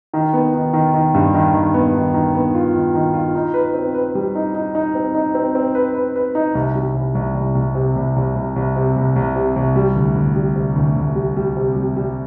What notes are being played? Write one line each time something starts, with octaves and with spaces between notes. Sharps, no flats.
D#3
B3
D#3
D#3
D#3
G2
D#3
D#3
B3
D#3
D#3
B3
F4
D#3
D#3
F4
D#4
B4
C4
B4
G3
D#4
D#4
D#4
C4
D#4
C4
C4
B4
B4
B4
D#4
C2
G3
C2
C2
C2
C2
C3
C2
C2
C2
C2
C3
C2
C2
C3
C2
G3
D2
D2
G3
C3
D2
D2
G3
G3
C3
G3
G3